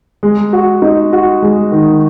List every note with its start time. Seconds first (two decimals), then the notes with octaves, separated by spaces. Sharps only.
0.23 G#3
0.53 F#4
0.82 D#4
1.13 F#4
1.42 G#3
1.72 D#3